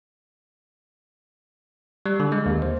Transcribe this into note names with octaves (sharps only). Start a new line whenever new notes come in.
G3
D3
G#3
D#2
C5